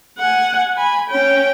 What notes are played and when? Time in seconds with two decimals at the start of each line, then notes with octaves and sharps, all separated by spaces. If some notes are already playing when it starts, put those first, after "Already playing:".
0.18 F#5 G#5
0.76 G#5 B5
1.09 C#4 G5